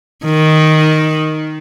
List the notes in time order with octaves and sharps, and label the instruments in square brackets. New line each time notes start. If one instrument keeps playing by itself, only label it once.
[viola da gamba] D#3